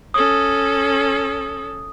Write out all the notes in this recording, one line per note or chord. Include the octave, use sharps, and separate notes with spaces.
C#4 A4 D#6